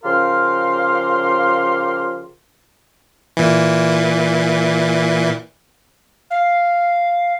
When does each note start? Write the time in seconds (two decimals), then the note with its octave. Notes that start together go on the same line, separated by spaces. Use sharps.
0.04 C#3 F3 G4 A#4 F5 C6
3.37 A#2 E3
6.30 F5